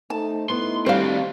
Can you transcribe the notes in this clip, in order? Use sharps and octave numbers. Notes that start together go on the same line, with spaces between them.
A3 D#4 C5 A5
A3 B3 D#4 E4 C6
G3 C4 D4 F#4 C5 F5